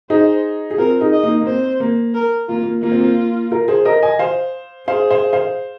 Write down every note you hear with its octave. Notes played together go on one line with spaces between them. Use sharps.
D#4 G#4 C5
G#4
C4 F4 A#4
D#4 G#4
D#5
A#3 D#4
A#3
C4 C5
A#3
A#4
A#3 F4
A#3
A#3 F4
C4
A#3
F4 A#4
G#4 C5
A#4 D#5
D#5 G#5
C5 F5
G#4 C5 F5
C5 F5
C5 F5